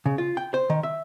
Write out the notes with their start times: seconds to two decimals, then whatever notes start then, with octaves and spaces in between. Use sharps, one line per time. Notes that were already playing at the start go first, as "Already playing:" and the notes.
0.06 C#3
0.18 F4
0.37 G5
0.54 C5
0.70 D#3
0.83 E5